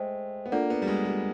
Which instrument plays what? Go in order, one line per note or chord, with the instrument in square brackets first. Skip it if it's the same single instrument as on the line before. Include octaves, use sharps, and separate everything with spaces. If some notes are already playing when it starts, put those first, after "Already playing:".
Already playing: [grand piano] G#3 A3 [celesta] C5 D#5 G5
[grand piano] B3
[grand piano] A#3 [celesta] D4 F4 A4 D5 F#5
[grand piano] B3
G3
G#3
G3